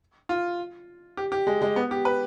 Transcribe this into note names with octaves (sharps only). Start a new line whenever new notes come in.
F4
G4
G4
G#3
G#3
B3
G4
B4